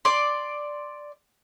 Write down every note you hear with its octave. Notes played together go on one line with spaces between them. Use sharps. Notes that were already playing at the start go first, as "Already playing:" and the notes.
D5 C6